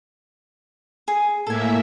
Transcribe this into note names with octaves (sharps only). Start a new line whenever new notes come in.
G#4
A2 A#3 A4 E5 G#5